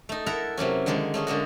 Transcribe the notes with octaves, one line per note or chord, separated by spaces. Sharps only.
A3 D#4
E4 A4 A#4 F#5 A#5
C3 F#3 A#3 C#4
D3 D#3 G#3 A#3 G#4
A3 C#4 G#4
D3 G#3 A#3 F#4